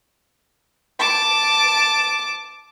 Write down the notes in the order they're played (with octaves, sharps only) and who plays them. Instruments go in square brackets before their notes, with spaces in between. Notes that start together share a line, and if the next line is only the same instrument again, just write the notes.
[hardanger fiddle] A5 D6